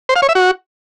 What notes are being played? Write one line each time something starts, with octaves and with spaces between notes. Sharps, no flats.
C5
F5
C#5
E5
F#4